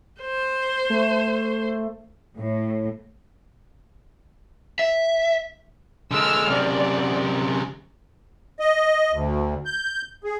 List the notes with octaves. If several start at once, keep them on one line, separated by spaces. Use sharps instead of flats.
C5
A3
A2
E5
D3 G#3 E6 F6
F#2 C3 D5
D#5
D2
G6
G#4